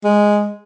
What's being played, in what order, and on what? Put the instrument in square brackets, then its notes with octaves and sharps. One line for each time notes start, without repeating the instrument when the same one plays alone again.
[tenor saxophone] G#3